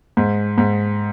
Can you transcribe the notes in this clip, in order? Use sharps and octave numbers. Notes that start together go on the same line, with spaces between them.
G#2
G#2